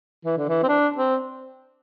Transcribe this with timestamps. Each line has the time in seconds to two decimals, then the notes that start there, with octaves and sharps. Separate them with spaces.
0.25 E3
0.38 D3
0.49 E3
0.63 C4
0.68 D4
0.96 C4